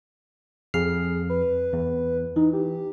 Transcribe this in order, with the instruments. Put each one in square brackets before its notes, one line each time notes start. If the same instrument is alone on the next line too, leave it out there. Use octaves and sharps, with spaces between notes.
[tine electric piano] F2 F6 C7 [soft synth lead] G#4
[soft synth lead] B4
[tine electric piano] E2
[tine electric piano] E3 [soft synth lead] D#4
[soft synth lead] G4